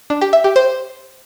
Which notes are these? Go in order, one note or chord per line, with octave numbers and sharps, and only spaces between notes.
D4
G4
E5
G4
C5